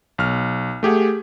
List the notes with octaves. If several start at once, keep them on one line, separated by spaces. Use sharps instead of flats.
B1 F6
A3 G4 G#4 F#5